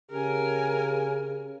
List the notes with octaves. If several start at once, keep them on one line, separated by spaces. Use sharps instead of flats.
C#3 G4 A#4 G#5